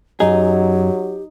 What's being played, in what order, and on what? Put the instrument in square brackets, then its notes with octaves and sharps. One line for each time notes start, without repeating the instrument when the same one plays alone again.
[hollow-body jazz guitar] F#2 G#4 [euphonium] F#3 [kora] D#4 [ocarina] G4